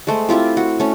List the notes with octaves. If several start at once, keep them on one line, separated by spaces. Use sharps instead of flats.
G#3 A3 C5
C4 E4 F4 G4
F#4
A3 C#4